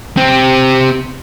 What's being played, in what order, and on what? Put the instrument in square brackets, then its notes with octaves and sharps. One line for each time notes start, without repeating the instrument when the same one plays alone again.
[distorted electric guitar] C3 C4